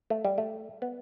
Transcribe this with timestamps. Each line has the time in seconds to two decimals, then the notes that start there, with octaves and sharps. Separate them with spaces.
0.10 A3
0.25 G3
0.38 A3
0.82 B3